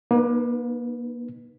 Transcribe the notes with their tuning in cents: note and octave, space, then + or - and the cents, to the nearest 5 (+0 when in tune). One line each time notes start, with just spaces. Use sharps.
A#3 +40 D#4 -30 B4 +0